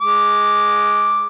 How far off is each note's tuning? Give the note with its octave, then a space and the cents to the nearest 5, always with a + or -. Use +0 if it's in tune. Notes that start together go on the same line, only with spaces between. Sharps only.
G#3 +0 D6 +0